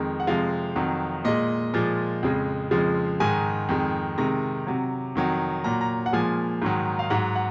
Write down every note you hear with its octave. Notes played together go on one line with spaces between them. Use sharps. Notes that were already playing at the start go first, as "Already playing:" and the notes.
Already playing: F2 D#3 G#3
F#5
F2 C3 F3 G#3 F5
F2 D#3 F#3
A#2 G#3 D#5
A#2 F3 G#3
F2 C#3 G#3
F2 C#3 F3 G#3
G#2 D#3 G#3 G#5
F2 D#3 G#3
C3 D#3 G#3 A#5
C3 F#3
F2 D#3 F#3
A#2 F#3 A#5
A#5
F#5
A#2 F3 G#3 G#5
G#2 D#3 F#3
F5
G#2 F#3 F#5
F#5